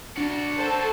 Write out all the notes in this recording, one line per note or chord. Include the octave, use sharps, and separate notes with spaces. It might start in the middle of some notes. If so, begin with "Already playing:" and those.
D4 F#4 D5
A4 C5